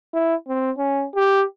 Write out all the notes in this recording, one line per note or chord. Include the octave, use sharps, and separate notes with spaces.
E4
C4
C#4
G4